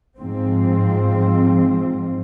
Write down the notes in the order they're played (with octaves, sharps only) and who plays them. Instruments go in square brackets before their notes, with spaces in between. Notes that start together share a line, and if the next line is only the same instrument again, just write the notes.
[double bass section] G#2 F3 C4